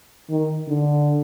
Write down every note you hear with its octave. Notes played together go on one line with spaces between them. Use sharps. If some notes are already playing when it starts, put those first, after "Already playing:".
D#3
D3